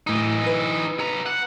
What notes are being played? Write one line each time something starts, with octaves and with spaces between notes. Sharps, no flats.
A2 E3 D#4 D#6
B4
B3 A#5
F#5